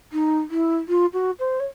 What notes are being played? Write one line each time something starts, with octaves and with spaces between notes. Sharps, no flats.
D#4
E4
F4
F#4
C5
C#5